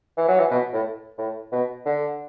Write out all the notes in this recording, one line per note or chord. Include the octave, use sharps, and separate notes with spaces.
E3
F#3
E3
B2
A2
A2
B2
D3